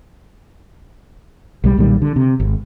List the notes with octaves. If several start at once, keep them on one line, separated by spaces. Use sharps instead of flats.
B1 G3
B1 A#2 D#3 G3
D3
C3
G#1